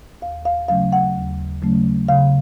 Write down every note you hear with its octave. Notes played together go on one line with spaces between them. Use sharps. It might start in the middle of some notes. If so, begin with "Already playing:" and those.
D#2 F5
F5
C#3 F#3 A3 C#4 F5
F#5
D#2
C#3 F#3 A3 C#4
C#3 F5